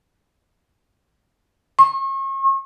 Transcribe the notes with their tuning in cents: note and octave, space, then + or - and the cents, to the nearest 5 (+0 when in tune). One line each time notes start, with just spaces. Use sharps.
C#6 -40